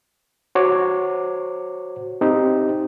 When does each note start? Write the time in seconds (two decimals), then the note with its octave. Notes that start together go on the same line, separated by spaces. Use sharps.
0.55 F#4 C5 C#5 D6
2.21 C4 D#4 G4